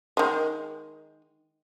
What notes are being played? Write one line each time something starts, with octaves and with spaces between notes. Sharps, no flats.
D#3 G#3